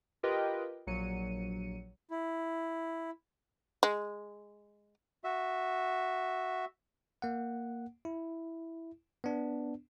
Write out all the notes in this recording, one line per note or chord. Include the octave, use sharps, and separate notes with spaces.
F4 G4 A#4 B4 D#5 G5
A#1 F#3 C#7 D#7
E4
G#3
F#4 E5
A#3 F#5
E4
B3 D4